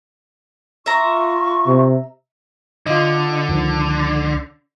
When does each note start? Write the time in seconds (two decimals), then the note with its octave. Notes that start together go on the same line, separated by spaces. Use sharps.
0.86 F4 E5 A#5 C#6
1.67 C3
2.86 D3 F4 D#5
3.49 C#2 D#3 F3